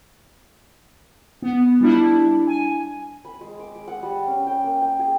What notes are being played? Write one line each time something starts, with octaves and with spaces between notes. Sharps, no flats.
B3
G3 D4 E4
G#5
B5
G#3
D6
G#3
F#5
G3
C#4
G5
A#3
G5
G#4